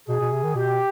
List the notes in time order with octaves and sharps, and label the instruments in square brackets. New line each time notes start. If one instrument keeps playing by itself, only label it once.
[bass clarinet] B2 [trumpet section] G#4
[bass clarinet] B2
C3
D#3
[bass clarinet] B2 [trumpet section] G4